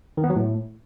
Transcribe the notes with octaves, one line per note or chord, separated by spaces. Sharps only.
D#3
B3
F#3
A2